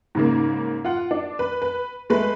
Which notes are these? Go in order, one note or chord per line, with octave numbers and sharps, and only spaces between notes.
G#2 C#3 A#3
F4 F#5
D4
B4
B4
G#3 A3 B4